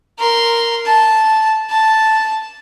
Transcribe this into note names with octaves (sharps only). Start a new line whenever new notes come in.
A#4 C6
A5
A5